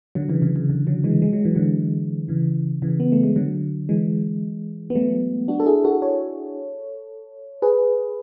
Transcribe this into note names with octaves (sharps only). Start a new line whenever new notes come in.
D3 F#3
C#3 E3
C#3 E3
C#3
D3
D3 F#3
E3 G#3
G#3
F#3
E3
D3 F#3
C#3 E3
C#3 E3
B3
A3
G#3
D3 F#3
E3 G#3
B3
F#3 A3
D4 F#4
A4
E4 G#4
F#4 A4
A4 C#5
G#4 B4